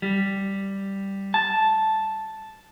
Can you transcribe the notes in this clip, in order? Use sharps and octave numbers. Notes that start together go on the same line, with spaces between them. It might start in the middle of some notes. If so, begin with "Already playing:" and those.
G3
A5